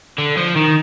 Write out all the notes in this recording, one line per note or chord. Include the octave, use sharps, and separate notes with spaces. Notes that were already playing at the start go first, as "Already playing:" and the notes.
D3
F3
D#3